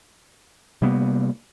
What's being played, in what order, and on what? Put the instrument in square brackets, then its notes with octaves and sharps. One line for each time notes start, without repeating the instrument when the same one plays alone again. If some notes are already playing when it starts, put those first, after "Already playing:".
[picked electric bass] C3 G3 A#3 B3